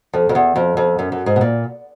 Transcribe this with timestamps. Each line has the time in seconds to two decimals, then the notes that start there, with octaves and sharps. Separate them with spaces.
0.13 F2
0.29 F2
0.35 E2
0.56 F2
0.77 F2
0.99 F#2
1.12 F#2
1.26 G#2
1.36 B2
1.41 A#2